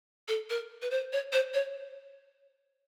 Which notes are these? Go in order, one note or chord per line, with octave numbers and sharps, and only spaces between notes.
A4
A#4
B4
C5
C#5
C5
C#5